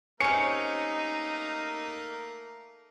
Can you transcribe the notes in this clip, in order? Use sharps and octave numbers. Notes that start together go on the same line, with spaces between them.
C3 A3 A#3 C#4 D#4 A#4 C#7